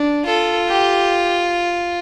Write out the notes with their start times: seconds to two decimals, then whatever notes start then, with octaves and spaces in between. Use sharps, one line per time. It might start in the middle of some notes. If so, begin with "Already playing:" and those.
Already playing: D4
0.26 F4 A4
0.68 G4